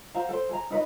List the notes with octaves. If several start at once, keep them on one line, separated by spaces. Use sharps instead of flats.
F#4 C5 F5 A#5
A4 C5
G#4 A#5
D#4 B4 C#5 D#5